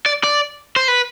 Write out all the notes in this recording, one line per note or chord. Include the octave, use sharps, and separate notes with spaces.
D5
D5
C5
B4